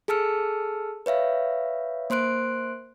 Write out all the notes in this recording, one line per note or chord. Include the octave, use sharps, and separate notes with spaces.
G#4 A4 A5 E6 F6 C#7
B4 C#5 E5 F5
A#3 C5 C6 F#6 D7